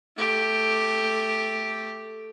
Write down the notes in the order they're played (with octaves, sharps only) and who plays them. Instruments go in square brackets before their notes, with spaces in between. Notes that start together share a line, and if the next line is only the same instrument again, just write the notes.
[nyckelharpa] A3 G4